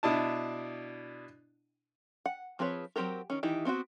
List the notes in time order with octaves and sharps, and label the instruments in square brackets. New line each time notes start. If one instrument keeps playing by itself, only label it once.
[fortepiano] B2 D4 E4 A5
[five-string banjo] F#5
F3 C4 G#4 B4 C#5
F#3 A#3 C4 G4 A#4
D#3 C#4
D#3 E3 D#4 E4 G4
B3 C4 E4 F#4